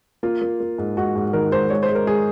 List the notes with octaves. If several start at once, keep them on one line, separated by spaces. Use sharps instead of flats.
A#3 F4
A#3
A#3
G#2
G#2 F#4
G#2
D#3 A#4
G#2 C5
G#3 C#5
C5
G#3
A#4
G#3 G#4